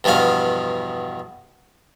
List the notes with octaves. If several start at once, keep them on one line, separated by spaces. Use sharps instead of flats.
E2 G2 B2 F3 F5